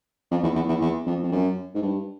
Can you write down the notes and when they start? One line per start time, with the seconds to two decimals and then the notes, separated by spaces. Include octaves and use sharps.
0.31 F2
0.43 E2
0.56 E2
0.69 E2
0.81 E2
1.06 F2
1.24 F2
1.32 F#2
1.75 G#2
1.82 G2